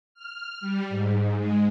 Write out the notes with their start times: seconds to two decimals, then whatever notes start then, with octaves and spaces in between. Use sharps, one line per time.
0.14 F6
0.61 G3
0.89 G#2
1.37 G#3